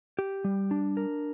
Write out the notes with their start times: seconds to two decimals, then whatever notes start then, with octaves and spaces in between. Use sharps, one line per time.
0.19 G4
0.44 G3
0.71 D4
0.97 A#4